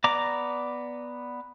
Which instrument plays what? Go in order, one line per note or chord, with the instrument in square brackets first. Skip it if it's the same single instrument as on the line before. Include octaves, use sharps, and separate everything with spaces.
[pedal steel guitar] B3 D5 A#5 D6